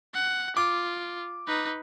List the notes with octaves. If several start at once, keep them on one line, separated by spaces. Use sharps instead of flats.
F#5
F4 D6
D#4 B4